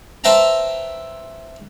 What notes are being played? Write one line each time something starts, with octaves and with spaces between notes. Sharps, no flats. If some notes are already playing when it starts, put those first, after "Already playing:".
B4 C5 E5 G5 A5 A#5